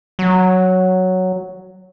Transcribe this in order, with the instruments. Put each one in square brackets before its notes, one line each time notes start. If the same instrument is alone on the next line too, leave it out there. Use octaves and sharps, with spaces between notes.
[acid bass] F#3